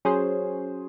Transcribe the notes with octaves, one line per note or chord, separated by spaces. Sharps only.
F#3 C#4 G#4 C5